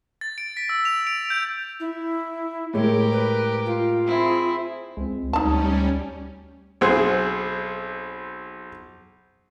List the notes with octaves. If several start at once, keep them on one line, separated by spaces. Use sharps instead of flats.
A6
D7
B6
E6
F7
D7
G6
E4
A2 G#3 G4 A#4 C#5
B4
F4
C4 E4 G#4
C#2 G#3 C4
D2 G3 C#4 D#4 A5
B1 C4 G#4 C5